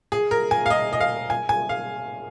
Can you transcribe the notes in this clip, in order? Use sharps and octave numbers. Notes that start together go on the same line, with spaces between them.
G#4
A#4
G#5
F5
D#5
D#5
F5
G#5
G#5
F5